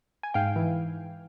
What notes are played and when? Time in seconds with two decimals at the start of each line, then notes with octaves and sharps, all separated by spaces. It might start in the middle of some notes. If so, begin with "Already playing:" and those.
0.23 G#5
0.34 G#2 F5 G5
0.56 E3